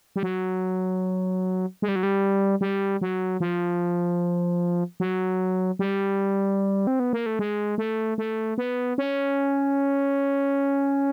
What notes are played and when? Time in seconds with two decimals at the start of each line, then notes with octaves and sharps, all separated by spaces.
0.16 G3
0.23 F#3
1.82 G#3
1.88 G3
1.96 F#3
2.03 G3
2.61 G3
3.01 F#3
3.40 F3
5.00 F#3
5.79 G3
6.87 C4
7.00 B3
7.13 A#3
7.26 A3
7.39 G#3
7.78 A3
8.18 A3
8.58 B3
8.98 C#4